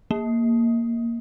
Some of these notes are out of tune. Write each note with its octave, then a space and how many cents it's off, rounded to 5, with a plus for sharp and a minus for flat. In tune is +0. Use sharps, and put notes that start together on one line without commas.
A#3 -5